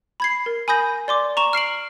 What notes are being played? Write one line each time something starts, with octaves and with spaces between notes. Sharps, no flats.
B5 G#6 C7
A#4
G#5 B5 D#6 G6 A#6
D5 C6 D6
A#5 C#6 E7
F6 C7 D7 F#7